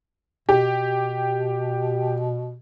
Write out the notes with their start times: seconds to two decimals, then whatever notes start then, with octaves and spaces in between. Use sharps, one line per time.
0.49 B2 G4